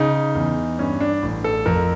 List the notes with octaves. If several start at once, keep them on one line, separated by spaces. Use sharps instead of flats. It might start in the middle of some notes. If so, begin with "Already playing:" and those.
Already playing: C#3 D#4
E2
G2 C#4
D4
A1
A4
F2 A#4